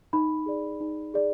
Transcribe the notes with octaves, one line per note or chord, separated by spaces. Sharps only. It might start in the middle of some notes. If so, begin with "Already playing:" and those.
D#4 B5
G#4 D5
D#4
G#4 D5